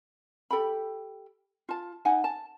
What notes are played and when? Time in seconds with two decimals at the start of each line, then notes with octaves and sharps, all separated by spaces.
0.51 G4 A4 G5 B5
1.69 F4 A5
2.05 D#4 F#5 G#5
2.24 A5